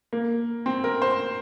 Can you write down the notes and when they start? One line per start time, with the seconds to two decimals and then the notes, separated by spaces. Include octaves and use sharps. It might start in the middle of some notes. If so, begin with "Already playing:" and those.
0.13 A#3
0.66 C4
0.84 A#4
1.02 C5